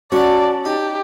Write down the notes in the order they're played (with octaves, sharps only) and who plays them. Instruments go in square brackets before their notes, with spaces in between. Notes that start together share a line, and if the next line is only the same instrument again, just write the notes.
[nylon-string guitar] C#4 [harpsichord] F#4 F#5 [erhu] D5 [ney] A5
[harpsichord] D#4 [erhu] G4